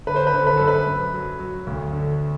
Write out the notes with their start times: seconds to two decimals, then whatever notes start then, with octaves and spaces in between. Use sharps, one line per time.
0.07 D3 B4
0.16 C5
0.27 B4
0.34 D3
0.47 B4
0.57 F#2 A4
0.68 B4
0.87 F#2
1.14 F#3
1.39 F#3
1.67 D2
1.93 D3